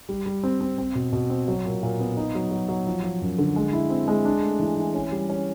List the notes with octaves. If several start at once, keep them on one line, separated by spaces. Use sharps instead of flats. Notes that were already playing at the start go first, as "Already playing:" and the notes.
G3
G3
C4
C4
C4
B2
B2
C4
F#3
A#2
A#2
B3
D#4
F#3
F#3
F#3
F3
F3
F#2
D3
G#3
E4
C4
G#3
D4
A3
E3
E3
C#4
G3
C#4